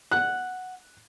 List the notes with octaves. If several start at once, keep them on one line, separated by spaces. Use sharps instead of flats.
F#5 F#6